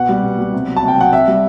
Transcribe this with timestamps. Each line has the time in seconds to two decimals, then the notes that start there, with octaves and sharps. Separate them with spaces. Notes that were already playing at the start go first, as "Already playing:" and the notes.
Already playing: B2 F#5
0.09 G3
0.23 B2
0.39 G3
0.53 C3
0.68 F#3
0.76 A5
0.83 C3
0.88 G5
0.97 F#3 F#5
1.12 C3 E5
1.28 G3